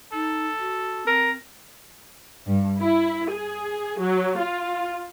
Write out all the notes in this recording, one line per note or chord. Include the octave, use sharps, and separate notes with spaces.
D#4 A4
F#4
C4 A#4
G2
E4
G#4
F#3
F4